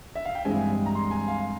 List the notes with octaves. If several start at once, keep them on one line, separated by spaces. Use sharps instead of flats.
E5
F5
G5
G2 E3 G#3 C4 G#5
A#5
C6
G#5
F5